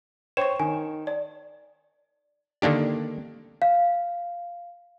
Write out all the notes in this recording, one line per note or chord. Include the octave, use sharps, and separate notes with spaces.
C5 C#5 G5 C#6 E7
D#3 G#5
D5
D3 D#3 A#3 D4 G4
F5